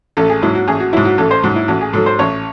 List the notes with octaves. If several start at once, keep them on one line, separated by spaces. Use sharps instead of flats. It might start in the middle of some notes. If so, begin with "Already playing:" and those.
A1 A4
G#4
G#2 F#3 E4
F#4
A1 G#4
F#4
G#2 F#3 E4
F#4
A1 A4
C5
G#2 F#3 F#4
E4
A1 F#4
G#4
G#2 F#3 A4
C5
A1 C#5